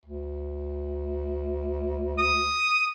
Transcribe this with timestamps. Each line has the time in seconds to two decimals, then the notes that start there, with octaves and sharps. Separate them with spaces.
0.06 D2
2.18 D#6